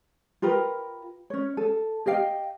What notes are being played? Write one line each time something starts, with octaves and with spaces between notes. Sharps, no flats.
F4 G4 A#4 B4
C#4 C#5
A4
G4 D#5 F5 G5